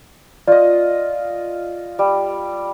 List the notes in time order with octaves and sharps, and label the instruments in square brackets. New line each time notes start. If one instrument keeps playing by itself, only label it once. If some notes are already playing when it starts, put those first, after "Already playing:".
[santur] F4 D#5 [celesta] D5
[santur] G3